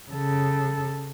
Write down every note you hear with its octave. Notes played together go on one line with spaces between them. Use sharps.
C#3 A4